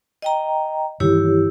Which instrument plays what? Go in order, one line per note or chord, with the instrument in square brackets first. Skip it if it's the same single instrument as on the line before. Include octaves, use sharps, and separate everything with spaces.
[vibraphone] D#5 G5 A#5
[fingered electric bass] G2 D#3 E3 [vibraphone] E4 G4 C#5